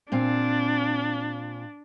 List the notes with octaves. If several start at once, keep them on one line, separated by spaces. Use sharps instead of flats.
A#2 C4 D4 F5